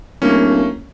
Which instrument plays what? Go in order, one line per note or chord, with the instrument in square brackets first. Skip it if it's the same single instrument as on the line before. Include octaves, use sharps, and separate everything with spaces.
[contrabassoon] D1 [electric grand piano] A3 A#3 C#4